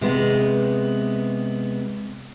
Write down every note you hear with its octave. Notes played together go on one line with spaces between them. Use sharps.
C3 G#3 B3